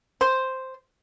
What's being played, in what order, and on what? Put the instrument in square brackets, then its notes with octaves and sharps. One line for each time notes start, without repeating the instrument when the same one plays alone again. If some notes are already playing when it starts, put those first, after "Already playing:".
[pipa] C5